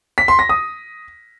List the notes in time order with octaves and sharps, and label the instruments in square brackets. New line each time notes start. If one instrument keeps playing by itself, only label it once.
[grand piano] B6
C6
A#6
D#6